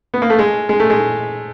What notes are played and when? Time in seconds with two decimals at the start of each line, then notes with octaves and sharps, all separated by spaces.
0.14 B3
0.22 A#3
0.30 A3
0.39 G#3
0.69 G#3
0.80 A3
0.90 G#3